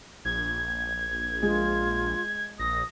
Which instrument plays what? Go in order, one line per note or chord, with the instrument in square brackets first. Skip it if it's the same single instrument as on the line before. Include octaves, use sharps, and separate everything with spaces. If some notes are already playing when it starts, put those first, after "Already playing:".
[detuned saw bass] A#1 [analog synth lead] G#6
[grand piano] G#3 [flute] F4
[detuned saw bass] A#1 [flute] D#6 [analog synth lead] A#6